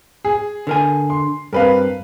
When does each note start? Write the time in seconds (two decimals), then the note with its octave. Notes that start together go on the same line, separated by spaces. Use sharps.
0.25 G#4
0.67 D3 A#4 G#5
1.10 C6
1.53 G2 C4 A#4 B4 F5